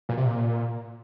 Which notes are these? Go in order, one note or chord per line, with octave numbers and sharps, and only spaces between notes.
A#2
C3
A#2